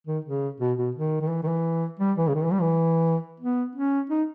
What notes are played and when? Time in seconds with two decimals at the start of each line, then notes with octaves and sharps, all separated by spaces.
0.07 D#3
0.24 C#3
0.60 B2
0.77 B2
0.95 D#3
1.21 D#3
1.29 E3
1.43 D#3
1.48 E3
1.99 G3
2.17 E3
2.28 C#3
2.35 D#3
2.44 E3
2.52 G3
2.61 E3
3.40 B3
3.75 C#4
4.10 D#4